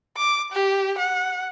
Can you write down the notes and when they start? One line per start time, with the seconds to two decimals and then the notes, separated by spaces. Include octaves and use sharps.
0.17 D6
0.52 G4
0.98 F#5